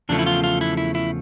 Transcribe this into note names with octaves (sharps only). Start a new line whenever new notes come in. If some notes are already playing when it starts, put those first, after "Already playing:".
E2 C#3 F3 A3 D4
E4
F4
F4
E4
E4
E4